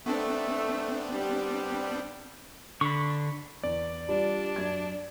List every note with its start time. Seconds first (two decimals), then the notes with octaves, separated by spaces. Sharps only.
0.06 A3 B3 C4 D4
1.12 G3
2.81 D3 B5 C#6
3.63 E2 D5
4.09 G3 D4 F4
4.56 F#2 G#6